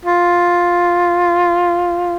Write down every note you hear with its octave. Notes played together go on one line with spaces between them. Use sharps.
F4